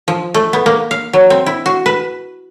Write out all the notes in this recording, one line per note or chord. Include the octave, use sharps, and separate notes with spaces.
F3
A3
B3
A#3
F5
F#3
C4
E4
F#4
B4